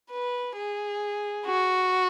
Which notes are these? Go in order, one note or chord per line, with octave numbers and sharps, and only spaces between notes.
B4
G#4
F#4